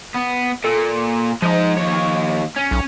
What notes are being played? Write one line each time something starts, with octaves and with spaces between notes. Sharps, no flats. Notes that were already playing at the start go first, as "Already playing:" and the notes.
B3
A#2 A4
F3 G#3 D#4
D#2 C#5
C#4
B1